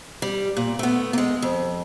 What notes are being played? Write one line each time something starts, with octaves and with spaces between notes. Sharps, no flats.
G3
A#2
A3 B3
G#3 A#3
F2